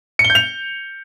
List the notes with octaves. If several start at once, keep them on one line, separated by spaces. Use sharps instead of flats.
C#7
G7
G6
F7